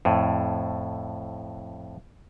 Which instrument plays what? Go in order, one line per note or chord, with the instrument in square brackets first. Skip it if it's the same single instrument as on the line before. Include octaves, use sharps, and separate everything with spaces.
[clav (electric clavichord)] F2 A2